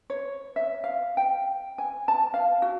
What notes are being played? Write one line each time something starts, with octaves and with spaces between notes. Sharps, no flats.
C#5
E5
F5
G5
G#5
A5
F5
F#4